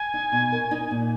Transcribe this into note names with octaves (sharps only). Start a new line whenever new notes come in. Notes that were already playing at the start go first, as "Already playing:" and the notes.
Already playing: G#5
D#4
B2
A#4
D#4
A#2